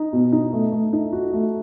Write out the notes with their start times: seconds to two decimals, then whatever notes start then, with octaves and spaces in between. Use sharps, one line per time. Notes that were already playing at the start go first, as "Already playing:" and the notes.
Already playing: D#4
0.13 B2
0.32 D#4
0.53 A3
0.72 A3
0.93 D#4
1.13 F#4
1.33 A3